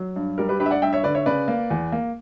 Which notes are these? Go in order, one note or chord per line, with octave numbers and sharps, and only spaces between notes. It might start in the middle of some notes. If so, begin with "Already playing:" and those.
Already playing: F#3
G2
G3 A#4
G4 B4
G2 G4 B4
E5
D5 F#5
G2 E5 G5
C#5 E5
D3 B4 D5
C#5 E5
C#3 B4 D5
A#3
E2
A#3